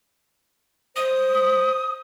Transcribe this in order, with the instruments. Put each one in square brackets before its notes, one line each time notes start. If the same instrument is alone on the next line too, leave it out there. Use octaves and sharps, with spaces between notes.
[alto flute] C5 [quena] D#6